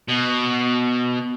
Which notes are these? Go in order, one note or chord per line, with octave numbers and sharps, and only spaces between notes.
B2